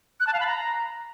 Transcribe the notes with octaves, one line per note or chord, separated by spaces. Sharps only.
F#6
A5
F5
B5
A#5